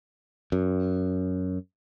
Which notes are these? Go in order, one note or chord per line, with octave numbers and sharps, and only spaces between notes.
F#2